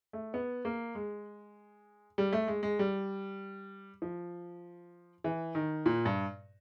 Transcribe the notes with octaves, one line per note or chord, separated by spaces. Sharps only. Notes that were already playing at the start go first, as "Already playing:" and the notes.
A3
B3
A#3
G#3
G3
A3
G#3
G#3
G3
F3
E3
D#3
A#2
G2